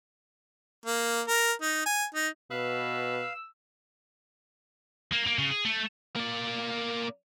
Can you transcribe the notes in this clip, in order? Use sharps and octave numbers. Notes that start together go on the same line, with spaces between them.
A#3
A#4
D#4
G#5
D#4
B2 B4 F5 E6
A#3
A#3
C#3
G#4
A3
A#3 D5